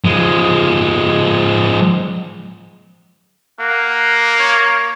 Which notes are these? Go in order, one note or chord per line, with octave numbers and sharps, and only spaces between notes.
F3 G#3
A#3 F#5
C#5